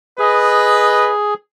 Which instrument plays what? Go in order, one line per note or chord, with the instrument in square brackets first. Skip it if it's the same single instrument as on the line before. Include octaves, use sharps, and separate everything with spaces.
[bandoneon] G#4 [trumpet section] B4 D#5